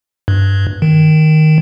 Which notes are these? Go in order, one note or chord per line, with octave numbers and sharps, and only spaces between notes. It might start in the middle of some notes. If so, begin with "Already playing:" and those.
G2
D#3